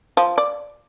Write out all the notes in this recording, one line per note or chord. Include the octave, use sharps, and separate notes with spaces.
F3
D5